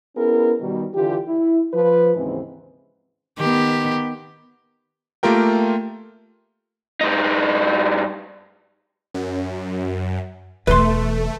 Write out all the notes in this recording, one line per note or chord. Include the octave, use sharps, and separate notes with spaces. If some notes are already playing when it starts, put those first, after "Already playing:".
B3 C#4 E4 G#4 A#4
B2 D#3 G3
D3 E3 F4 G4
E4
F3 B4
D#2 G#2 C#3 E3 G#3 C4
D#3 B3 G4
A3 A#3 F4 G4 A#4 G5
G2 D#4
F#2
E1 E3 A3 B4 C6